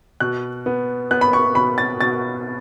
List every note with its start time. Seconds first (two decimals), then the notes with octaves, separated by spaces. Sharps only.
0.20 B2 F#6
0.66 B3
1.11 B3 F#6
1.21 B5
1.33 C#6
1.55 B2 B5
1.78 A6
2.01 B2 A6